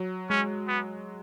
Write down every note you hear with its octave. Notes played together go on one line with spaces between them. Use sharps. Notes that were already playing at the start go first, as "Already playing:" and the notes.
Already playing: F#3
G#3 C#4
B3